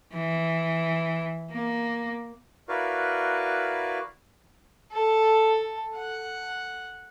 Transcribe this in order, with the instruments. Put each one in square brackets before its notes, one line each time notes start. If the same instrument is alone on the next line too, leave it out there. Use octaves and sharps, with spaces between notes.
[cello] E3
A#3
[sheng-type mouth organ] E4 F#4 A#4 B4 D5 F5
[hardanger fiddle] A4
F#5